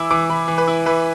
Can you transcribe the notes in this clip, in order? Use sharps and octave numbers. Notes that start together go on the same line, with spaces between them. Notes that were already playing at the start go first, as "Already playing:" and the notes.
Already playing: E3 E4 D6 E6
E3 D6
E3 B5
E3
B4
E4
E3 B4